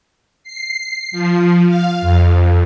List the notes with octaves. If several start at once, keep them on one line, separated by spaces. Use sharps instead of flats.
C7
F3
F5
F2